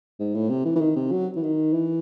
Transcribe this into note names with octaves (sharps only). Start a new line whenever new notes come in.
G#2
A2
C3
E3
E3
D#3
C3
F#3
E3
D#3
E3